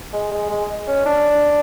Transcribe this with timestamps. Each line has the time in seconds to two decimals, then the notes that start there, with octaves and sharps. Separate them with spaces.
0.13 G#3
0.31 G#3
0.50 G#3
0.87 C#4
1.06 D4